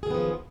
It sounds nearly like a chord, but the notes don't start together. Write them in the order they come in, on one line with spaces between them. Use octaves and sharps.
G#4 D#3 B3 F3